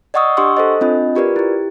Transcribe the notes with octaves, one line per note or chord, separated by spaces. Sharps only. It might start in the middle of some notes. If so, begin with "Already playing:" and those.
D5 D#5 F#5 C#6 D#6 E6
D4 G4 F#5 C6 C#6 E6
A4 C5 D#5
C4 D4 F4 D#5
F4 G4 A#4 B4 D5
E4 G4